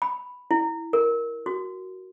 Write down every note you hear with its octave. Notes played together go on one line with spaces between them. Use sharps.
B5
E4
A#4
F#4